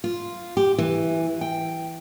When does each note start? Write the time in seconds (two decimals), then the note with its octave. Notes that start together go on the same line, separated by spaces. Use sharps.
0.04 F4
0.57 G4
0.78 E3
1.41 G5